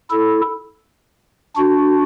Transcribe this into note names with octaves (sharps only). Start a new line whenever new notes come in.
E4 A4
D4 F#4